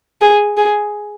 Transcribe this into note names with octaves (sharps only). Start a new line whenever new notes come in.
G#4
G#4